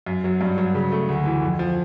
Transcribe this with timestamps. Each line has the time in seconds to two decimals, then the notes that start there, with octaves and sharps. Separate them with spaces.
0.06 F#2
0.24 F#3
0.41 G2
0.58 F#3
0.75 C#3
0.92 A3
1.08 D2
1.26 E3
1.43 F2
1.59 F3